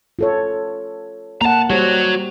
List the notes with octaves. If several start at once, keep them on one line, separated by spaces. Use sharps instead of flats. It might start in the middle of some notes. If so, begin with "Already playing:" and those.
F4 A4 C#5
A#3 F#5 A5 A#5
G3 F#4 G4 C5 C#5